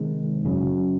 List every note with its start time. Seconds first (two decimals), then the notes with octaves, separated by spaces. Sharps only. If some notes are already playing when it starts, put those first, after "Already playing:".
Already playing: C3 D#3 G#3 C4
0.45 F#2 C#3 F#3